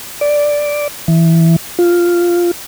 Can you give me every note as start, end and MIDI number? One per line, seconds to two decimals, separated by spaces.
0.21 0.88 74
1.08 1.56 52
1.79 2.51 65